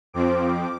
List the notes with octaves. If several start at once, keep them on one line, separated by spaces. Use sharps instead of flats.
F2 F3 C4 D6